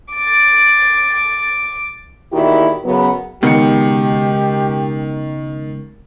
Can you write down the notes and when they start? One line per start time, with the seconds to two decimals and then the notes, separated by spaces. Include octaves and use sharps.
0.14 D6 A6
2.32 E2 A#2 D#3 E4 F#4 G4
2.84 F#2 C#3 F#3 B3
3.43 C#2 B2 D#3 G4 C#7